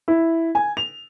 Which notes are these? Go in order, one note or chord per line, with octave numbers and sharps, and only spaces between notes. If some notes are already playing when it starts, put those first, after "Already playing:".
E4
G#5
F7